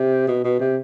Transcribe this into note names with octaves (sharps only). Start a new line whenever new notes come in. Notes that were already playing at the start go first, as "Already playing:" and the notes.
Already playing: C3
B2
B2
C3